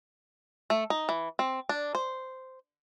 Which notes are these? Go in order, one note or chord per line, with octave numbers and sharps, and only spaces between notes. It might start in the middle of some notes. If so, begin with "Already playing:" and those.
A3
D#4
E3
C4
D4
C5